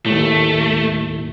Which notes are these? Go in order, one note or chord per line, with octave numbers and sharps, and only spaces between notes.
D#2 A2 A3